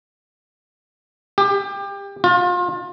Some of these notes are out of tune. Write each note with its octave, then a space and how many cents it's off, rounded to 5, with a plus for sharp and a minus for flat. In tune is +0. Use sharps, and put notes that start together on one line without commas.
G4 +25
F4 +30